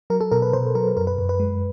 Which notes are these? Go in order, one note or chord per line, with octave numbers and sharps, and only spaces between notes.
F#3 A#4
A4
B2 A#4
B4
B2 C5
F#3 A#4
F#2 A#4
B4
F#2
B4
G#3